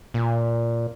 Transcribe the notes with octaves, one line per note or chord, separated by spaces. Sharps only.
A#2